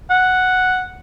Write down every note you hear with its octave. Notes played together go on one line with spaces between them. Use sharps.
F#5